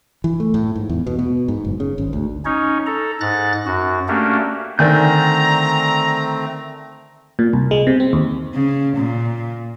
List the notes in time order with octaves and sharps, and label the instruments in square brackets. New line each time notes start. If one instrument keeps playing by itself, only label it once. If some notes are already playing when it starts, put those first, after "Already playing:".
[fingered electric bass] E3
A3
A2
G#2
E2
B2
B2
G#2
F#1
C#3
G#1
D2
[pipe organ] C#4 D#4 C#5
A4 A#5
G#2 F#6 A6 A#6
F#2 F#4
A3 A#3 C#4 D4 F#4 G4
[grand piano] D3 D#3 [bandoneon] A3 C4 [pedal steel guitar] D5 G#5 G6 [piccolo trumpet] A#5
[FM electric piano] A#2
C2
G#3
C3
C4
D#2
[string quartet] C#3
A#2